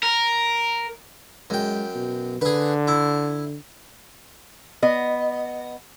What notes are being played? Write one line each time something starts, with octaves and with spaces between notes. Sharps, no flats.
A#4
F#2 G#3 G5
B2
D3 G#4 B4
E4
B3 D#5